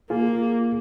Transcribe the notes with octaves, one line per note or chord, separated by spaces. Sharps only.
A#3 F4 G#4